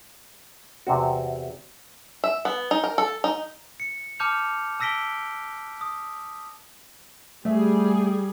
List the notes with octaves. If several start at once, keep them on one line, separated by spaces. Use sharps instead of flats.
E2 C3 C4 F#4
E5
B3
D#4
A#4
A4
D#4
C#7
A5 D6 F6 G6 C#7 F7
A5 E6 A#6 B6 D7 G7
D#6
G3 A3 G#4 E5